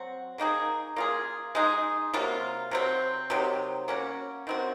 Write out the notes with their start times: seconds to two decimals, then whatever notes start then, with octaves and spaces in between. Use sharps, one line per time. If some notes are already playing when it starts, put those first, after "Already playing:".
Already playing: F#3 C4 F#4
0.38 D#3 A#3 D#4 G#4
0.96 A#3 F4 G#4
1.55 G#3 D#4 G#4
2.13 C3 F#3 A#3 F4
2.71 C3 F#3 C4
3.30 C3 D#3 F#3
3.88 A#3 C#4 F#4
4.47 D#3 F#3 C4 F#4